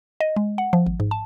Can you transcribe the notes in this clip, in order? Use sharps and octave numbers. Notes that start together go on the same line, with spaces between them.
D#5
G#3
F#5
F3
G#1
G#2
A5